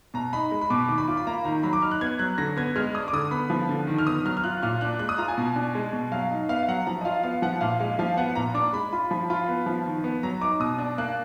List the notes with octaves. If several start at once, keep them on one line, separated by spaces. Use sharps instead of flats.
B2 A#5
D#4 B5
G#3
B5
B2 D6
D#3 D6
B5
F4 D6
B5
A#3 A#5
D#3 A#5
F#3 B5
D6
D#4 F6
F#6
B3 G#6
F#3 F#6
D3 A#6
B3 G#6
G#3 F6
D4 D#6
D6
D3 D#6
B3 B5
F3
D3
D#3
F6
B3 D#6
F#3 F6
F6
F4 F#6
A#2 F6
D4 F#6
G#3 F#6
D#6
F4 A#5
G#5
B2
D4
G#3
B2
F#3 F5
D#4
B3 F5
F5
F#3 F#5
F3 A#5
D#5
F4 F5
B3 F5
F3 F#5
A#2 F5
G#3 F5
F3 F5
B3 F#5
A#2 A#5
D4 D6
G#3 B5
F4 B5
F3 B5
F4 B5
B3
F3
D#3
B3
F#3 A#5
D#4 D6
B2 D#6
D4
A#3 F#6